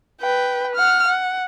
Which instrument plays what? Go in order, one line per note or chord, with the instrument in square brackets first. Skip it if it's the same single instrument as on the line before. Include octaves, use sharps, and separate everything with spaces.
[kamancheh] B4 G5
F#5 F6
F#5